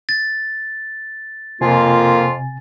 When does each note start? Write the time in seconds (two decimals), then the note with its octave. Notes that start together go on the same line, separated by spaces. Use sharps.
0.09 A6
1.61 F2 C3 A#3 F4 G#5